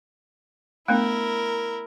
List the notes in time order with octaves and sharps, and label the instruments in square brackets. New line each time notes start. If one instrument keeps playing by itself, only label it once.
[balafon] A3 B3 D4 [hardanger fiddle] E4 A#4